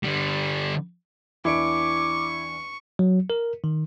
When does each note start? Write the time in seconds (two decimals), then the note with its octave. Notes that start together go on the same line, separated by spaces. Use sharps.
0.03 D3 G3
1.45 E2 D4 E4 C#6 D6 D7
2.99 F#3
3.30 A#4
3.64 D#3